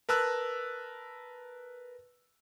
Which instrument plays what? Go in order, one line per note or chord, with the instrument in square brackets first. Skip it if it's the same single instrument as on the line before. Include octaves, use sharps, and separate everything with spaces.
[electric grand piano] A#4 B4 A5 E6 F#6